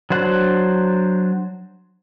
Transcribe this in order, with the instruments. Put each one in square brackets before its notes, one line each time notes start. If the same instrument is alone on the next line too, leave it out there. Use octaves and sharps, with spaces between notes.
[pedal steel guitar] F#3 D4 C5 F#5 F#6